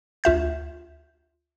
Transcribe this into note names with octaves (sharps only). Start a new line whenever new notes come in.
D2 F4 E5 G6